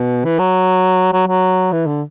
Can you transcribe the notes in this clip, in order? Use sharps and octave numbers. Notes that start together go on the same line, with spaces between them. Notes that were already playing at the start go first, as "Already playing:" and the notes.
Already playing: B2
E3
F#3
F#3
F#3
E3
D3